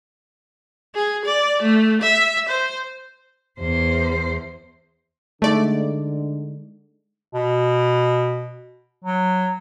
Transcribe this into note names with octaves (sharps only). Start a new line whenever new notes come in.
G#4
D5
A3
E5
C5
E2 C5
D3 G#3 A3 D#4 D5
B2
F#3